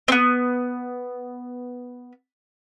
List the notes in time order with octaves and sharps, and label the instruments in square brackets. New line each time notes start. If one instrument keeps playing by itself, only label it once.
[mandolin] B3 C4